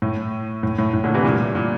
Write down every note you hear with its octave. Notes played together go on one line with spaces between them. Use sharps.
A2
A2
A2
A2
A#2 D3
C3 E3
G2 A#2
A#2